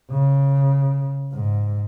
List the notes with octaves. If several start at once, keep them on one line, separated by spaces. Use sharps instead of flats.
C#3
G#2